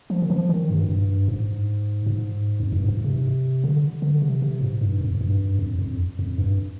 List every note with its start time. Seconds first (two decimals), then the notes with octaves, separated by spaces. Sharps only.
0.10 F3
0.22 D#3
0.30 F3
0.49 D#3
0.70 G2
0.88 G2
1.28 G#2
2.06 G#2
2.60 F2
2.73 G2
2.85 G#2
3.04 C3
3.64 D3
4.02 D3
4.22 C3
4.42 C3
4.61 G#2
4.81 G2
5.01 F2
5.15 F2
5.21 G2
5.59 F2
5.79 F2
6.19 F2
6.38 G2